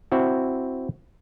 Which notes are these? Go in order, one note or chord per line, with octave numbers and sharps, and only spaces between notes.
C4 E4 F#4